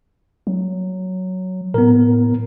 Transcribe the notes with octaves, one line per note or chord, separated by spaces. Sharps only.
F#3
A2 B3 A#4